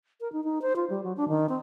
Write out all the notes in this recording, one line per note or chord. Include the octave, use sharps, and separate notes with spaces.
A#4
D#4
D#4
C5
F4
G3
F#3
D4
D#3
C4